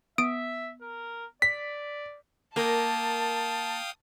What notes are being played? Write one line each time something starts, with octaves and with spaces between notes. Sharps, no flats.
B3 E5 D#6 D7
A#4
D5 B6
A#3 A#4 F5 G5 A5 D#6